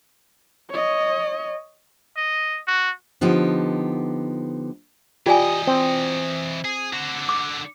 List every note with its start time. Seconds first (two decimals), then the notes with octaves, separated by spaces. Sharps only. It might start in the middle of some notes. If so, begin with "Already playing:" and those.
0.70 C#5 D#5
2.17 D#5
2.67 F#4
3.21 D3 F3 B3 D#4 G4
5.26 E3 F4 G4 D5 D#5 G#5
5.67 C4
6.65 G#4
6.93 D3 F#4
7.29 D6